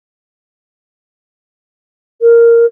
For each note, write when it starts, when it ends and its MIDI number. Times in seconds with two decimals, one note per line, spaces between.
2.21 2.66 70